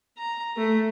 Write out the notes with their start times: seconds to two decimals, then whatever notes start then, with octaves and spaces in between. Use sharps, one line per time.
0.18 A#5
0.57 A3